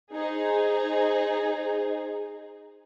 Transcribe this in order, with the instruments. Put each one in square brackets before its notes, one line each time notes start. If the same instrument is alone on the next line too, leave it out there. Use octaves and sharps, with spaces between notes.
[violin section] D#4 G#4 C5